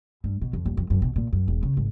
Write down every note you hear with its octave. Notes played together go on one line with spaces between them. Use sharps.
G2
B2
F2
D#1
F2
F#2
B2
A#2
F#2
E1
C#3
G#1